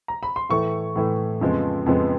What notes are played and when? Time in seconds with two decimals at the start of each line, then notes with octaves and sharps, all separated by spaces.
0.08 A#5
0.23 B5
0.36 C6
0.49 A2 E3 A3 C#6
0.96 A2 E3 A3
1.41 F2 C#3 F3 G#3 B3
1.86 F2 C#3 F3 G#3 B3